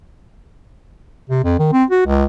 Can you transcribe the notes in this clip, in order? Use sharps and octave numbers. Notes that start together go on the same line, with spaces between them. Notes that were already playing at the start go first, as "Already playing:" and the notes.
C3
F2
D#3
C4
F#4
C#2